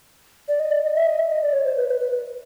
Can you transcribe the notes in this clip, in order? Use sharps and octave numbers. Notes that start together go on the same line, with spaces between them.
D5
D#5
D5
D#5
E5
D#5
E5
D#5
D5
C#5
C5
B4
B4
B4
B4